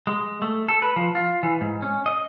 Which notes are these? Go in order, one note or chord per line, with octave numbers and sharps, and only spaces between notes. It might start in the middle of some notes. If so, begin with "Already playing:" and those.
G#3
A3
A4
B4
F3
F4
E3
G#2
C#4
D#5